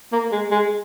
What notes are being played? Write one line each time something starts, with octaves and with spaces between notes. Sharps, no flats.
A#3
G#3
G#3